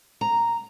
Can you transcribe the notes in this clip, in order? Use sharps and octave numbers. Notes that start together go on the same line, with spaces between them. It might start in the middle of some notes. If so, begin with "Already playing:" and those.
A#5